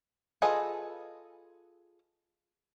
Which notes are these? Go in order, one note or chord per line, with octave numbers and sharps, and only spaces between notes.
F4 G#4 A4 B4 D#5